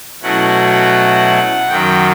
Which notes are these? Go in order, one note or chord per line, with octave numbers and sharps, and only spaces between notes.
B2 F#3 A3 C#4 E4 F#5
F#2 D#3 F#3 G5